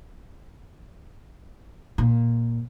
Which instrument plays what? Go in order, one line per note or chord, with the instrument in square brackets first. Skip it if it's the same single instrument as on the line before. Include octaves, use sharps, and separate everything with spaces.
[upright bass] A#2